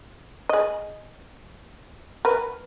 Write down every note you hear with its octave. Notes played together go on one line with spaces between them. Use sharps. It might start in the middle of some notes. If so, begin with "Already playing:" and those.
G#4 D#5
A#4 B4